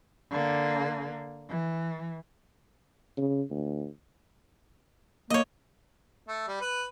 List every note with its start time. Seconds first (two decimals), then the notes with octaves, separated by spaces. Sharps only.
0.31 D3 A#3
1.49 E3
3.17 C#3
3.51 D2
5.30 A#3 C#5 D#5
6.28 A3
6.48 G3
6.61 B4